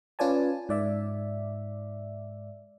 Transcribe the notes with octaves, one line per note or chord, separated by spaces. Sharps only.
C#4 F4 B4 D5 G#5 A5
G#2 D5 E5